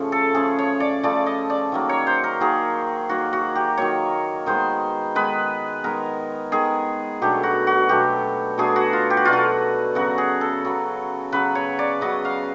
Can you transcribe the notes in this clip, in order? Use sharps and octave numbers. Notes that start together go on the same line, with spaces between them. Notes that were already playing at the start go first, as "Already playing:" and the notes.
Already playing: C#3 F3 A3 C#4
A4
C#3 F3 A3 C#4 G#4
C#5
D5
C#3 F3 A3 C#4 D5
D#5
D5
D#3 F#3 A#3
C#5
C5
A#4
D#3 F#3 A#3 G#4
D#3 F#3 A#3 F#4
F#4
G4
D#3 F#3 A#3 C#5
D#3 G#3 B3 C5
D#3 G#3 B3 B4
D#3 G#3 B3 A#4
D#3 G#3 B3 G#4
B2 F#3 A3 D4 G4
F#4
F#4
B2 F#3 A3 D4 G4
B2 F#3 A3 D4 G#4
F#4
F4
G4
F#4
B2 F#3 A3 D4 F4
F#4
C#3 F#3 B3 F#4
G#4
A4
C#3 F#3 B3
C#3 F#3 B3 B4
C#5
D5
C#3 F#3 B3 D#5
F5